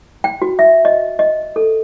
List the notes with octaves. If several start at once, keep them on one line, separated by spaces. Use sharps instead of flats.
G5
F#4
E5
D#5
D#5
A4